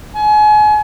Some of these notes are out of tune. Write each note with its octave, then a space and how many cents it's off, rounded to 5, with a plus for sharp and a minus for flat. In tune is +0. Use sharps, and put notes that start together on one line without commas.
G#5 +35